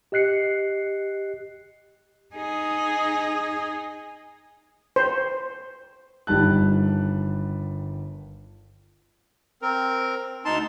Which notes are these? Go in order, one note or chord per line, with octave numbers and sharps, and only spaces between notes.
G4 D#5 F#6 C7 C#7
D#4 G#4
C5
G1 D#3 G3 A5 F#6
C4 A#4
D2 D#4 A5 C6